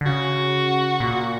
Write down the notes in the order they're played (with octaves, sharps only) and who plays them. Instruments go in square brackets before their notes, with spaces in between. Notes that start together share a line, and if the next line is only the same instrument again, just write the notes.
[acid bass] D3
[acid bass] C#3 [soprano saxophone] F#4
[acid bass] A#2